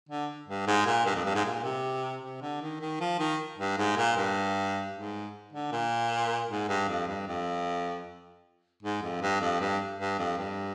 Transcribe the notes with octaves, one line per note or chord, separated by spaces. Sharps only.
D3
G2
G#2
A#2
G2
F2
G2
G#2
A#2
C3
C3
D3
D#3
D#3
F3
D#3
G2
G#2
A#2
G2
G#2
D3
A#2
G#2
G2
F2
G2
F2
G#2
F2
G2
F2
G2
G2
F2
G2